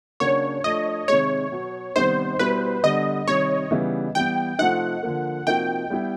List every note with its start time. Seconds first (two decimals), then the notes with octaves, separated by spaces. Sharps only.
0.20 C#3 F#3 A#3 D4 F#4 C#5
0.64 F3 A3 D4 D#5
1.08 C3 D#3 G#3 C#5
1.52 B2 F#3 B3
1.96 C3 D#3 G3 B3 D#4 C5
2.39 B2 G3 B3 E4 B4
2.83 D3 G3 B3 D4 D#5
3.27 C3 D#3 G3 C#5
3.71 C#3 E3 G3 B3 D#4
4.15 E3 G3 B3 G5
4.59 C3 F3 A3 C4 D#4 F#5
5.03 D3 F3 A#3
5.47 C3 F3 A#3 D#4 F#4 G5
5.90 G3 B3 E4